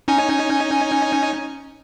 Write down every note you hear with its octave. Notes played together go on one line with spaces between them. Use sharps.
C#4 D#4 G#5